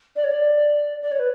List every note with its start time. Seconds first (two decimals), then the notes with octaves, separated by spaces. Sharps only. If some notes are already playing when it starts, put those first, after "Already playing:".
0.16 D5
0.24 C#5
0.31 D5
1.02 D5
1.11 C#5
1.19 B4